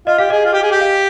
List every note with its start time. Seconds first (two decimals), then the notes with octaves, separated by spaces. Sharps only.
0.07 F4 D#5
0.18 G4 F5
0.30 G#4 D#5
0.45 F4
0.53 G4
0.63 G#4
0.71 G4
0.81 F5